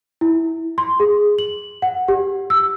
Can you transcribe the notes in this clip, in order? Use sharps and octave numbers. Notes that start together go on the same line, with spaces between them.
E4
C6
G#4
F#7
F#5
G4
E6